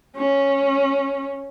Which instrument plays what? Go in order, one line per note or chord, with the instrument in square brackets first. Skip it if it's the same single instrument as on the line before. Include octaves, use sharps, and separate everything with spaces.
[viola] C#4